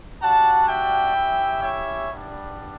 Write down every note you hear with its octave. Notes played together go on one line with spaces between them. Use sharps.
G3 D4 F#4 F#5 A5
E5 G5
C#4 E4 G4
C#5 E5
G3 B3 D4